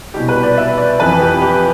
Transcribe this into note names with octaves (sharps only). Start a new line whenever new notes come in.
C2 B2 G4
B4
D5
E5
D5
F2 E3 B4
G4
G4